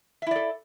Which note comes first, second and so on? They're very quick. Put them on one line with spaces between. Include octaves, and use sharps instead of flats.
E5 E4 D5 A4